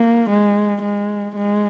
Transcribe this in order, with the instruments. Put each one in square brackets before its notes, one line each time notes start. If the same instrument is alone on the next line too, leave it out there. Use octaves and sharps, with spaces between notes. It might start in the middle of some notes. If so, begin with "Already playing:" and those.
Already playing: [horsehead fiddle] A#3
G#3
G#3
G#3